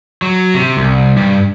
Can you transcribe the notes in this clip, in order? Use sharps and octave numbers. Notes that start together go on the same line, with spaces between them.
F#3
C3
C2
G2